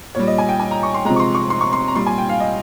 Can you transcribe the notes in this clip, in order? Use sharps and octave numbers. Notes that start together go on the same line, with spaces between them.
A#2 G3 C#5
D#5
G#5
G5
G#5
A#5
C#6
C6
C3 F3 G#3 A#5
C#6
C6
C#6
C6
C#6
C6
A#5
A#2 G3 C6
G#5
G5
F5
D#5